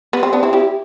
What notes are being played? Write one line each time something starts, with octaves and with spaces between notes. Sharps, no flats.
B3
C4
B3 D4
C4 E4
E4 G4